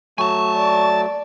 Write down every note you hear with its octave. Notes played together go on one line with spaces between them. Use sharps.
F#3 A3 G#5 A5 C#6
D5